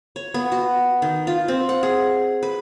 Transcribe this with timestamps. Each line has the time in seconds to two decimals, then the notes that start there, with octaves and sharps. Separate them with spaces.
0.16 C#5
0.34 B3
0.52 F#4
1.02 D#3
1.27 F4
1.48 C4
1.69 F#5
1.83 G#4
2.43 B4